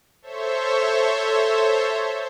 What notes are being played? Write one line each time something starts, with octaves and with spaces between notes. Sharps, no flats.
A4 C5 C#5 E5